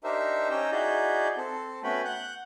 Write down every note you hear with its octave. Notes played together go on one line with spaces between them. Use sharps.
D4 D#4 G4 A#4 C5 E5
C#4 D#4 G5 A#5 E6
D#4 E4 F#4 G#4 D5 G6
C4 A4
A3 B3 C#4 F#4 G5 B5
F#5 F#6 G6